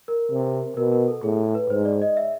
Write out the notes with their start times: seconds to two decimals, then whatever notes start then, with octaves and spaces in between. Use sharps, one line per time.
0.08 A#4
0.31 C3
0.77 B2 A#4
0.92 A#4
1.08 A4
1.23 A2 G#4
1.55 B4
1.70 G#2 C5
1.85 D5
2.02 D#5
2.17 E5